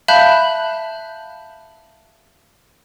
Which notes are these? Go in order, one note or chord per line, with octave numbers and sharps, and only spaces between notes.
E5 F5 A5 B5 F#6 G6